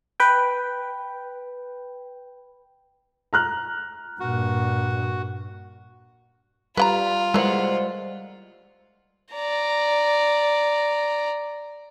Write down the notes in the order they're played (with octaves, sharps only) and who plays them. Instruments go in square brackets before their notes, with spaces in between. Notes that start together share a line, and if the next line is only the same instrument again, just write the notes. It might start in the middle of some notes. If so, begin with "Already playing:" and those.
[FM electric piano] B4 G5
[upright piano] A#5 F6 F#6
[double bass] G2 A#2 [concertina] F#4
[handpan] G3 [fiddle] F4 [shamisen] B4 F#5 A#5
[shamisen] E3 A#3 [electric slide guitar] G3 C5 F#5 [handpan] G#3
[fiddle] D5 A#5